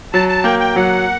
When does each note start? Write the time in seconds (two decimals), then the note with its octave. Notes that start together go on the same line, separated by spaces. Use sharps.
0.13 F#3 A5
0.29 A5
0.44 A#3 G5
0.59 G5
0.76 F#3 F#5